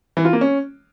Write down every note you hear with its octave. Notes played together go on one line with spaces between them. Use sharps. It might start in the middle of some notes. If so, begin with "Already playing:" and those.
E3
F4
A#3
C#4